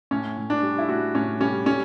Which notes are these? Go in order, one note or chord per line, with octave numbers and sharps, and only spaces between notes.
A2 C#4
A2
D4
G3
E4
A2 F#4
A2 C#4
G3 C#4
G3 C#4